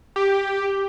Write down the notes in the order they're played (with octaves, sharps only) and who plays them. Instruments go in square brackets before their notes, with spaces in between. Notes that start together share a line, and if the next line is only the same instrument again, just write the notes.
[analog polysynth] G4